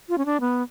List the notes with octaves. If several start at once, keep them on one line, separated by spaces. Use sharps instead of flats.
F4
C#4
D4
B3